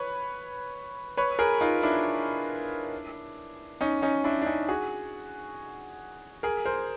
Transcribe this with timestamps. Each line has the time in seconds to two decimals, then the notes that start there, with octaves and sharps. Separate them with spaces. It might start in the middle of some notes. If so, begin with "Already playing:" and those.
Already playing: B4 C#5
1.17 B4 C#5
1.39 G#4 A#4
1.61 D#4 F4
1.83 D4 E4
3.81 C#4 D#4
4.02 C#4 D#4
4.24 D4 E4
4.42 D4
4.46 C#4 D#4
4.68 F#4 G#4
6.43 G#4 A#4
6.66 A#4 C5